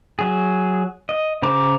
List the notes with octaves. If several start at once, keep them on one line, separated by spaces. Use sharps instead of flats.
F#3 G#4
D#5
C#3 C5 A#5 D6